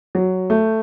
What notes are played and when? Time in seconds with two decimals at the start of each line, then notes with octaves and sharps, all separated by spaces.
0.15 F#3
0.50 A3